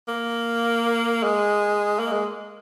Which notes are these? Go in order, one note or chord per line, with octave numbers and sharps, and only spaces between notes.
A#3
G#3
A#3
G#3